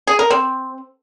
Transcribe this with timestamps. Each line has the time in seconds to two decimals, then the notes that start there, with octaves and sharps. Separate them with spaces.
0.07 G#4
0.19 A#4
0.30 C4